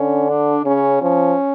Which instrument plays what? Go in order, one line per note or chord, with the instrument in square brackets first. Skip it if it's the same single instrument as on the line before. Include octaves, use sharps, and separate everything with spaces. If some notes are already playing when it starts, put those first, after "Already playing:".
Already playing: [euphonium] D3 [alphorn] C#4
[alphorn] D4
[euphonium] C#3 [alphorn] C#4
[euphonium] F3 [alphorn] C#4